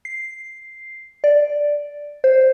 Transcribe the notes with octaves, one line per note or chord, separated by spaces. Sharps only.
C7
D5
C5